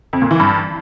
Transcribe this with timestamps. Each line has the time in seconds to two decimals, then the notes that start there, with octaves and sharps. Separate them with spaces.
0.13 F2
0.22 A#2
0.31 E3
0.40 G2